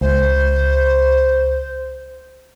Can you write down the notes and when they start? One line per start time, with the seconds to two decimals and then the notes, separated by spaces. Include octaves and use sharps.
0.01 C#2 C5